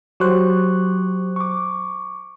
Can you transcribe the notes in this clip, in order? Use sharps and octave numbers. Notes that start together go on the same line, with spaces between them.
F#3 G4 C5 C#6 F#6
C#6 D6